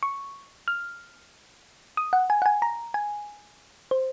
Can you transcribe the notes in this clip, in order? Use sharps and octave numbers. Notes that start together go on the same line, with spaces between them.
C#6
F6
D#6
F#5
G#5
F#5
G#5
A#5
G#5
C5